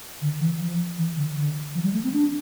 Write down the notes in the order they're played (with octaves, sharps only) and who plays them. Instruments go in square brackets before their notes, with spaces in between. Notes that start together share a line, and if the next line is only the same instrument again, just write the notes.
[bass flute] D3
E3
F3
E3
D3
D3
F3
G3
A3
C4
D4